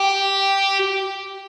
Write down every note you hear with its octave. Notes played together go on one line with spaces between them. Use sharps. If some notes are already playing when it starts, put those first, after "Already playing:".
Already playing: G4